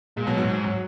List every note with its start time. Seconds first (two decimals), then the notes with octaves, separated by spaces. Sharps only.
0.16 A#2 G#3
0.26 B2 F#3
0.37 G#2 F#3
0.47 G#2
0.64 F#3